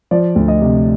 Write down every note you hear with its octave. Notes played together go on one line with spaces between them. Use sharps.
F3 D5
D2
D#5
C3